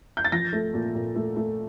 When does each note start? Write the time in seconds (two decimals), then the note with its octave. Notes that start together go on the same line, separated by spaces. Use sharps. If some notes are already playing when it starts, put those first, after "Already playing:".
0.17 G6
0.25 A6
0.32 F3 A#6
0.53 A3
0.74 A#2
0.95 A#2
1.16 A3
1.36 A3